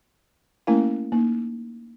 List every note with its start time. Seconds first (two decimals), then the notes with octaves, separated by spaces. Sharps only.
0.67 A3 A#3 C#4 E4 A#4 F5
1.12 A#3 D#4